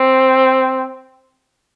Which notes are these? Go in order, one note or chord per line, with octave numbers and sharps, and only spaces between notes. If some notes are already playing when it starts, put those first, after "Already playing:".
Already playing: C4